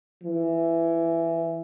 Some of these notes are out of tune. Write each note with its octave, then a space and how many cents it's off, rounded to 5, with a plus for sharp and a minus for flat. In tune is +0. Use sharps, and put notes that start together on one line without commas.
E3 +15